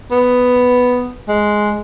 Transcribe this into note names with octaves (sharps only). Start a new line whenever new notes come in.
B3
G#3